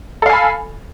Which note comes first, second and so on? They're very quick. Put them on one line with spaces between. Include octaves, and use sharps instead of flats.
A4 F5 G#5 B5